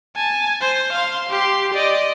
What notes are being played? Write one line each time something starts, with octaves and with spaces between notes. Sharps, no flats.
G#5 A5
C5
F5 C6
G4 C6
D5 D#5